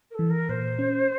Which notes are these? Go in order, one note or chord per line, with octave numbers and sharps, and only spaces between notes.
A#4
A4
E3
A#4
A#2 C5
C#4